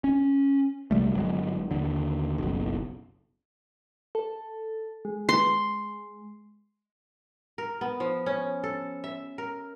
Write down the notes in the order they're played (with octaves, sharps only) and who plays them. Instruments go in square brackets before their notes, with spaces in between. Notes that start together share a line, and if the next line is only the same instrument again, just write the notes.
[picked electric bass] C#4
B1 C3 G3 A3
G1 F#3 G#3
D#2 D3
F#1 B1
[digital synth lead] A4
G#3
[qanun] C6
[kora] A#4
B3
F3
C#4
A4
E5
A#4